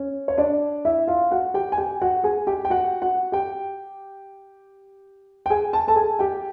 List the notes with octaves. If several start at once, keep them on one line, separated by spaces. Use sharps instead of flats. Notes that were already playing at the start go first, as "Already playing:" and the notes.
Already playing: C#4
C#5
D4 D5
E4 E5
F4 F5
F#4 F#5
G4 G5
G#5
G4 G5
F#4 F#5
G#4 G#5
G4 G5
G5
F#4 F#5
F#4 F#5
G4 G5
G5
G#4 G#5
A5
A4 A5
G#4 G#5
G4 G5